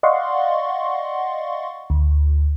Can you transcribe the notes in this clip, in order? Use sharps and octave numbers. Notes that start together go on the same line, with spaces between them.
D5 D#5 F5 F#5 C6 C#6
D2